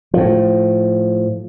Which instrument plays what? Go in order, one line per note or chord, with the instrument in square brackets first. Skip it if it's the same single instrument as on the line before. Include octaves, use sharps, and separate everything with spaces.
[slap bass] A2 F3